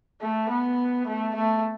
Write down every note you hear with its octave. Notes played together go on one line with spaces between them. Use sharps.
A3
B3
A3
A3